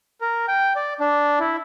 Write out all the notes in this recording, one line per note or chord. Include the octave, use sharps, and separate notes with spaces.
A#4
G5
D5
D4
E4